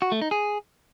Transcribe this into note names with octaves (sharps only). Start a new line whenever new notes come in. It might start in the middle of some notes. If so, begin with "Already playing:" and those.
F#4
A3
D#4
G#4